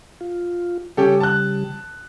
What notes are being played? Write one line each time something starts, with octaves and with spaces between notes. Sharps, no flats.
F4
C#3 G3 C#4 G4 A4
A5 F#6